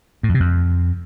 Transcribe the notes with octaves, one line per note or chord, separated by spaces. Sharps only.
A2
F2
C3
F2